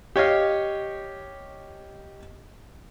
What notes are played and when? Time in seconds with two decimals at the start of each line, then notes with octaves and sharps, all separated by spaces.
0.16 G4 C#5 D#5 F5